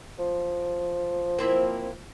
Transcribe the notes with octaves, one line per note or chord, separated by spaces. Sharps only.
F3
A#3 C4 E4